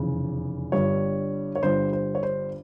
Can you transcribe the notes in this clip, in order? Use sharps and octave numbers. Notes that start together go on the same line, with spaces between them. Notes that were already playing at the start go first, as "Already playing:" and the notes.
Already playing: F1 E2 C#3
G1 G2 G3 C#5
C#5
G1 G2 G3 C5
C5
C#5
C5